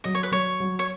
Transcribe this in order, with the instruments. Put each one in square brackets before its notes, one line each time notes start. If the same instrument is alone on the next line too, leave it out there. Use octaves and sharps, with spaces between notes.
[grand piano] F#3 [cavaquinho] D#5
[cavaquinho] C#5
B4
[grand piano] F#3 [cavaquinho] C#5
[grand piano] F#3
[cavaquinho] C#5